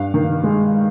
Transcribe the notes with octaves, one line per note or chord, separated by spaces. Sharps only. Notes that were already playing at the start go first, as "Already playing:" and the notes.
Already playing: G2 F5
D#3
G#3